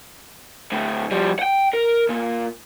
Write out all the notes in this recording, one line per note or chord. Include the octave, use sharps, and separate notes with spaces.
D2 A2
F3 G3
F#5 G5
A#4
A#2